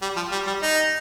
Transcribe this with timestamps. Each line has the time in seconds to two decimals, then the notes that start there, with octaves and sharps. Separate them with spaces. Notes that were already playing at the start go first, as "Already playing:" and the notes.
0.02 G3
0.16 F3
0.32 G3
0.47 G3
0.62 D#4